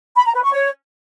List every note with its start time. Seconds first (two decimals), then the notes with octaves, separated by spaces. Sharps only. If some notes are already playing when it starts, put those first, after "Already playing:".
0.16 B5
0.25 A#5
0.34 B4
0.43 C#6
0.52 C#5